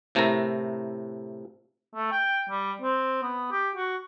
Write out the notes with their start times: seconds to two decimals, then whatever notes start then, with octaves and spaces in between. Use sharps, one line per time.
0.15 A2 C3 A3 E4 A#4 A#5
1.95 A3
2.12 G5
2.50 G3
2.82 C4
3.23 B3
3.52 G4
3.76 F#4